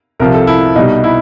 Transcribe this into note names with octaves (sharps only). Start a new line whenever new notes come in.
C2 C3 F3 A#4
A4
E4
C2 B2 G3 D#4
E4